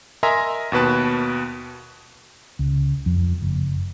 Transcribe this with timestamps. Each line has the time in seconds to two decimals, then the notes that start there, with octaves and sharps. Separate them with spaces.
0.23 A#4 D#5 E5 G#5 A#5 C6
0.72 D#2 B2 B4 A5
2.59 C#2
3.06 F2
3.42 F#1